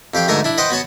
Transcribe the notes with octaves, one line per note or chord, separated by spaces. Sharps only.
F2 G4 F5 G5
D2 G#2 A3 A#4 G#5 A5
D4 E4
B4 C5 D#5 F#5 G5 C6
B3 F#4 C#5 A5